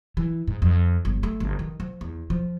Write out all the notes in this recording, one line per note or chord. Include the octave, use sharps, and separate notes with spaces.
E3
G#2
F2
G1
A3
G1
D#3
F3
E2
F3